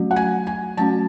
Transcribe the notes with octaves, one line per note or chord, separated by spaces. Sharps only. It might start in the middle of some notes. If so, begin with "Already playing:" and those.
Already playing: F#3 A3 C#4 F#4
F#5
G#5
G#5
F#3 A3 C#4 F#4 A5